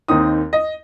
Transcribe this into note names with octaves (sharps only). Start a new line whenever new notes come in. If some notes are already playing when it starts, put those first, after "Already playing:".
D#2 D#3 C4 D#4 D#6
D#5